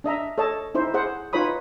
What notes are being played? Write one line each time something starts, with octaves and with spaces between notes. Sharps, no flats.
D4 D#5 E5 A#5
A4 C#5 D#5 A5
D#4 E4 C5
G#4 C5 F#5
D#4 F4 B4 C#5 B5 D#6